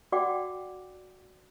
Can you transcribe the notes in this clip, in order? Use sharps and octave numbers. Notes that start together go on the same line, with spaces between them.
F#4 D5 F#5 G5 D6